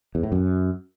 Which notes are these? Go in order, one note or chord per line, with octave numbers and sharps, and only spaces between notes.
E2
A2
F#2